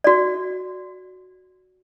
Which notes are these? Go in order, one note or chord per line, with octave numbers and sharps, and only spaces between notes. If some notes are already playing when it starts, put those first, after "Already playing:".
F#4 D5